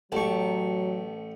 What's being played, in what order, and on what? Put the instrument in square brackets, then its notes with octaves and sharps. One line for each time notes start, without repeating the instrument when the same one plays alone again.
[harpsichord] A1 C#6 [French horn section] F#3 [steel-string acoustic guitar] B3 G4 A5